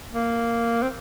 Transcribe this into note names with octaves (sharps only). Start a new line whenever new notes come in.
A#3
C4